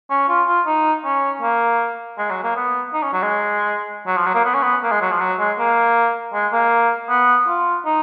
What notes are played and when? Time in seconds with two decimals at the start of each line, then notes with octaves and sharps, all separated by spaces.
0.11 C#4
0.29 F4
0.47 F4
0.66 D#4
1.05 C#4
1.42 A#3
2.18 G#3
2.30 F#3
2.43 A#3
2.56 B3
2.94 D#4
3.03 C#4
3.13 F#3
3.23 G#3
4.07 F#3
4.17 F3
4.27 F#3
4.35 A#3
4.45 B3
4.54 C#4
4.63 B3
4.83 A#3
4.92 G#3
5.02 F#3
5.11 F3
5.21 F#3
5.39 G#3
5.59 A#3
6.34 G#3
6.53 A#3
7.09 B3
7.48 F4
7.86 D#4